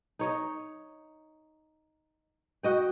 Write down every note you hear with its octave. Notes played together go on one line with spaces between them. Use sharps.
D#4 C#5 D#5
F#4 D#5 G5